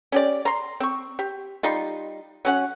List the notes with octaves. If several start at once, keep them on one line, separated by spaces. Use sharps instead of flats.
C#4 G4 D5
A#5 C6
C4 C#6
G4
G3 D#4 F4
F#3 C#4 F#5